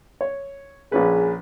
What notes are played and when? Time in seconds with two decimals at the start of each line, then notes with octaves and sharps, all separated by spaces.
0.21 C#5
0.92 A#1 C#4 G#4 B4